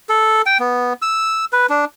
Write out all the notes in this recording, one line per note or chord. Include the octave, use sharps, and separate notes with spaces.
A4
G5
B3
E6
B4
D4